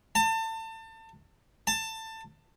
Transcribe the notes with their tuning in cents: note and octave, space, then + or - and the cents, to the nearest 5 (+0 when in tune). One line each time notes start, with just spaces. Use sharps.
A5 +30
A5 +20